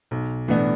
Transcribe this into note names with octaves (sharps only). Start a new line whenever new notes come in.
B1
A2 E3 B3 D4